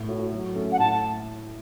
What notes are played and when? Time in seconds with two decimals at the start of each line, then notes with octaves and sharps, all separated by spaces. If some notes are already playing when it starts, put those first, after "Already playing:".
Already playing: A2
0.08 A3 F#4 C#5
0.33 F#3
0.55 A3 C#4 A4
0.72 F#5
0.79 A2 A5